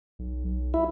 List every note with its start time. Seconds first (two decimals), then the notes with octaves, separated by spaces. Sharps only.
0.19 B1
0.45 B1
0.74 E4